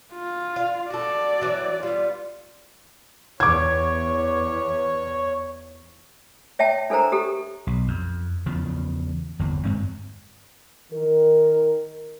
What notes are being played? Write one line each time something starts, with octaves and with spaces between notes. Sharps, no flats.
F4
F5
F#4 A4 D5
E3 F#3
G3 B3 F4
E2 C#5 D6 G#6
C#5 E5 G5 A5
D4 A4 A#4 C5 A#5
G4 A4
B1
F2
E2 C#3 F3
G1 E2
G2 G#3 C4
D#3 A#4